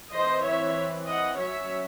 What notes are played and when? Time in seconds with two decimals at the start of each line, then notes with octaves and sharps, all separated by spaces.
0.14 E3 C4 C5 D#5
0.45 C#5 E5
1.08 D#5 F#5
1.39 F#3 C#4 C#5 E5